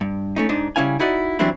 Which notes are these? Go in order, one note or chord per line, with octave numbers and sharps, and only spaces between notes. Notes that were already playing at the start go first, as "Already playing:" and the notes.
G2
A3 C#4 D#4
G#2 D4 D#4
C#3 G3 C#4 E4 F5 G#5
D#4 E4 F#4 D5 D#5
E3 F#3 G3 C4 D4 E4